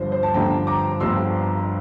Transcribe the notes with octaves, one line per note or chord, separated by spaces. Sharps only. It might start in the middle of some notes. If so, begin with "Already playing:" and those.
Already playing: G1 G2 D3 F3 C5
C5
A5
G1 G2 D3 F3 G5 A#5
A#5 D6
G1 G2 D3 F3 C6 E6